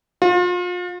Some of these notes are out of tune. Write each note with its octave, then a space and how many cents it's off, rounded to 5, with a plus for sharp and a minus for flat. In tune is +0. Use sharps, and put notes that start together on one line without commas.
F4 +35